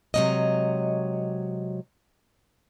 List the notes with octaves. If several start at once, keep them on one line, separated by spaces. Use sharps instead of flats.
C3 F#3 G#3 A#3 C#5 D#5